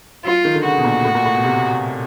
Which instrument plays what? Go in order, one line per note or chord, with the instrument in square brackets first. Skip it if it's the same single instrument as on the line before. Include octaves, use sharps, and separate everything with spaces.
[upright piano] F#3 [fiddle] F4
[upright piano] D#3
D3
[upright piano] C#3 [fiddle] F#4
[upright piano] B2
A#2
A2
A#2
A2
B2
C3